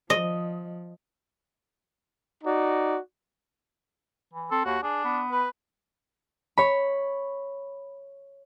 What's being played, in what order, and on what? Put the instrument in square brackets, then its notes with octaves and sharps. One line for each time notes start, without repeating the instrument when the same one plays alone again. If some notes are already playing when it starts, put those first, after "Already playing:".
[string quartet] F3 [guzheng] D#5
[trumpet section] D#4 F#4 D5
[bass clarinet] E3
[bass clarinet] C4 [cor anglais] A4
[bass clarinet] D#2 [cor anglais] F#4
[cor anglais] D4 [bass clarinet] G#4
[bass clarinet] B3
[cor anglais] B4
[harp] C#5 B5